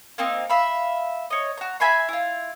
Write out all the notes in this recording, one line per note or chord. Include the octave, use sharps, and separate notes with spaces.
A#3 C4 D#4
E5 F5 B5
C#5 D#5
F#4 A#5
E5 G#5 B5 C6
E4 F4